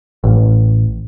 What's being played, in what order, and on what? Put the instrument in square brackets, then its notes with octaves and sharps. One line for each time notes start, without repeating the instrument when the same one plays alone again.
[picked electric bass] A1